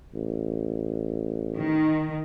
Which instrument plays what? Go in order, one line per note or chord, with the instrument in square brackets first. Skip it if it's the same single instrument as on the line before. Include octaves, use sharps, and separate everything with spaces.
[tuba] A1
[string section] D#3